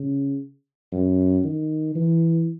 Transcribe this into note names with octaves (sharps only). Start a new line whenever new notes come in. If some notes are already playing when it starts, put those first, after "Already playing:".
Already playing: C#3
F#2
D#3
E3